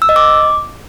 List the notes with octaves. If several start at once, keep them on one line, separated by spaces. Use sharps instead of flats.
E6
D#5
D6